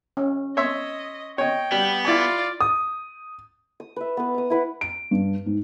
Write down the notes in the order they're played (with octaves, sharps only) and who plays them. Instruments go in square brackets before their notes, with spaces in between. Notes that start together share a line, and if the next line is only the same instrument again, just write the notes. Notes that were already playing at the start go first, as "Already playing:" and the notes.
[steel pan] C#4
[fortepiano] C#5 E5 C6 [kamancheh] D#5
[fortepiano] C#5 D#5 [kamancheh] G5
[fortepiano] G3 [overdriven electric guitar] B3
[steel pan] E4 G#5 [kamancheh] F4 D5
[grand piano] D#6
[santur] D#6
B4 E5
B3 B4
A#5 D#6
E4 B4 F#5
[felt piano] D7
G2
G#2